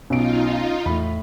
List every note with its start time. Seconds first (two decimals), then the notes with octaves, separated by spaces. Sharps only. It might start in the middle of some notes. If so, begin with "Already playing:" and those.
0.10 B1 B2 C#4 D#4 F4 D7
0.86 E2 A2 B5